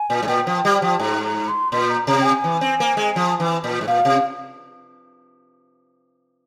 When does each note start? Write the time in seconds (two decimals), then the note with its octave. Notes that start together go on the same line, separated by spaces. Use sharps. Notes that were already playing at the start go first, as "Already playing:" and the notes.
Already playing: G#5
0.10 A#2
0.23 G#2
0.28 A#2 G5
0.47 F3
0.65 G3
0.82 F3
1.00 G#2 A#5
1.24 A#5
1.48 C6
1.72 A#2 C6
1.90 A#5
2.07 C3 A#5
2.21 G5
2.25 G#5
2.44 E3
2.61 C4
2.80 A#3
2.97 G#3
3.16 F3
3.40 E3
3.64 A#2
3.81 G#2
3.87 A#2 F5
4.05 C3